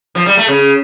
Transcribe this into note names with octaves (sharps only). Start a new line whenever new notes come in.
F3
G3
A3
C#3